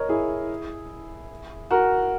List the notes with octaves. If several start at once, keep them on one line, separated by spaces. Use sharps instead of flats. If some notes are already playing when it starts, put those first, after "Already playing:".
Already playing: A#4 C#5 D#5
E4 G#4
F#4 A#4